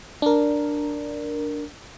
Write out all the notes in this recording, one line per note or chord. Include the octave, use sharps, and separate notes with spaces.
D4 A#4